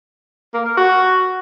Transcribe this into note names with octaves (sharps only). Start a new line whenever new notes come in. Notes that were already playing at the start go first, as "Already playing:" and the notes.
A#3
A#4
F#4